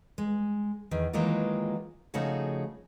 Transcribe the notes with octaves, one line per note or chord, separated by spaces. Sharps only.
G#3
E2 D#3
D#3 E3 F#3 G#3 A#3 F4
C#3 F3 A3 D#4 F#4 G#4